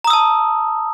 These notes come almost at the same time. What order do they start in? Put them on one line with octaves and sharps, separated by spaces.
A#5 D#6 E6 A5